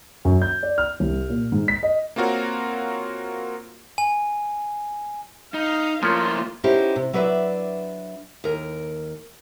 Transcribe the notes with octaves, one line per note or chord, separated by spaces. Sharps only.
F#2
G6
D5
F6
C2
A#2
G#2
B6
D#5
A#3 C4 F4 F#4 A#4 C#5
G#5
D#4 F5
F3 A3 A#3 C#4 E4 F4 A#4
B3 C#4 D#4 E4 G4 C5
C3
F#3 D4 B4 C#5 D5 E5
D#2 A#4